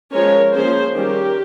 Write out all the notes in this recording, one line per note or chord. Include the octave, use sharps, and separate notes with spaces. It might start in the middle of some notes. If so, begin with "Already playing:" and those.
F3 G#3 C#4 A#4 C#5
F3 A#3 C#4 G#4 C5
D#3 G3 C#4 G4 A#4